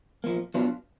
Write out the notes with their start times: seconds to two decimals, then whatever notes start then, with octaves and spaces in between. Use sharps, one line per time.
0.24 A#2 F3 A#3
0.54 B2 F#3 B3 D4 F4